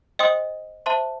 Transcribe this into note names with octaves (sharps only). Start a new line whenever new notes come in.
C5 D#5 G5 C6 D#6
C5 E5 A5 C6